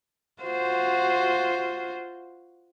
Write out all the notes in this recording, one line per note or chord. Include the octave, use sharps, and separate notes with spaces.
F4 F#4 C5